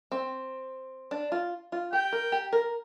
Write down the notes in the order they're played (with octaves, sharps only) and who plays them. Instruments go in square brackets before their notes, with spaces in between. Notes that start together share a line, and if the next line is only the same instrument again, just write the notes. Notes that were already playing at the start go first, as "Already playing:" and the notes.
[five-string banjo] C4
D4
F4
F4
[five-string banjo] G4 [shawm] G5
[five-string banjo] A#4
G4
A#4